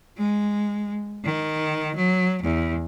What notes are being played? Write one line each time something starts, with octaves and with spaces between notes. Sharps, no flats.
G#3
D#3
F#3
E2